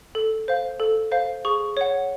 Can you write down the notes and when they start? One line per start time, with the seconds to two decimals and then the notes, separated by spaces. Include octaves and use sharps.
0.15 A4
0.48 C5 F5
0.80 A4
1.12 C5 F5
1.45 G#4 C#6
1.77 C#5 F#5